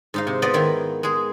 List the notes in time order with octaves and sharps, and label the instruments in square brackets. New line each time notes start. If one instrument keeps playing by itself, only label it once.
[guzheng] G#2 D#4 F5
C3
B3 F4 B4 D5 D#5
D#3 E4
G#3 G#4